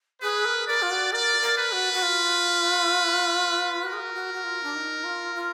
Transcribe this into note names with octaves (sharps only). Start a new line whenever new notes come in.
G#4 B4
A#4
A#4 D5
F4
F#4
A#4 D5
A#4
B4
F#4
F#4
F4
F#4 A#4
G#4
F#4
F#4
F#4
F4
D4
D#4
F4
F4